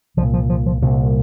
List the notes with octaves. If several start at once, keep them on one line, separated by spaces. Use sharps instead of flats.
C2 F3
A#2
F3
F3
F3
C2 A#2